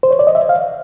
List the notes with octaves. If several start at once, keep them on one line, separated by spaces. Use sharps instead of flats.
C5
C#5
D5
D#5
E5
F5